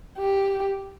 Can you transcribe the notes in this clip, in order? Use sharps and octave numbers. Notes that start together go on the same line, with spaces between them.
G4